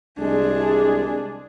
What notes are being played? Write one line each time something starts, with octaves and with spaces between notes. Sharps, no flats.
C2 G#3 D4 G#4